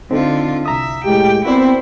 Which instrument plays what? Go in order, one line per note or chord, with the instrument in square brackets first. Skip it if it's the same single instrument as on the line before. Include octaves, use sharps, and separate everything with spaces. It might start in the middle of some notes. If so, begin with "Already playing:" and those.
[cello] D3 F4 [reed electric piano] C4 D#4 A4
[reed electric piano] C2 A#5 D#6 [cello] E5
[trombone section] A2 G#3 G4 [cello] G5
[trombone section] B3 C4 [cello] E4 C5 [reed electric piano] F#4 A#4 D5